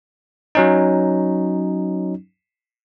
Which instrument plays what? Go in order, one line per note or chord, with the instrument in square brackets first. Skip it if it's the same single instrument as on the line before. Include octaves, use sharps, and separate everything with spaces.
[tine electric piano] F#3 C#4 D#4